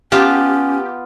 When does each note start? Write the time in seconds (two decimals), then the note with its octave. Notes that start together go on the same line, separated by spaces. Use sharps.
0.12 B3 C#4 F4 G4 A5